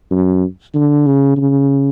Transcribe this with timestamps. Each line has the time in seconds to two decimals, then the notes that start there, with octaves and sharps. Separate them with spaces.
0.11 F#2
0.74 D3
1.06 C#3
1.37 C#3